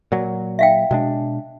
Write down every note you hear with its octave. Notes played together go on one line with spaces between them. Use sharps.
A#2 F#3
E5 F5 G5
B2 G#3 D4